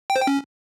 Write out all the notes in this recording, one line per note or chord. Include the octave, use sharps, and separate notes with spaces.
G5
C5
G5
C#4